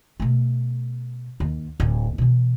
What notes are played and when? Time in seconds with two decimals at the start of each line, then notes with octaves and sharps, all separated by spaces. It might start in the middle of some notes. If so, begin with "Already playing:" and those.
0.20 B2 A3
1.40 D#2
1.80 D1
2.18 B2 E3